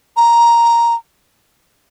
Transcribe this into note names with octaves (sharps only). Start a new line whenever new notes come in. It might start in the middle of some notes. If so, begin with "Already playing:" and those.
A#5